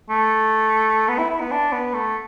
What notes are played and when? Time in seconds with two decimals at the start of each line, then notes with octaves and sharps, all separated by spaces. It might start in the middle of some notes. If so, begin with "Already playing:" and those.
0.10 A3
1.08 B3
1.18 E4
1.30 E4
1.41 B3
1.52 D4
1.72 B3
1.94 A3